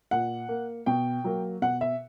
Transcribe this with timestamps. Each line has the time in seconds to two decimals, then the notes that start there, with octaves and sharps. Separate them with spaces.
0.11 A#2 F#5
0.49 A#3
0.86 B2 G5
1.24 F#3 A#3
1.62 B2 F#5
1.81 E5